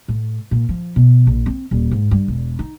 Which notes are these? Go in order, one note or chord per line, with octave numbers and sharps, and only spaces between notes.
A2
A#2
F3
B2
A#1
C4
D#1
G#2
G2
E1
D#4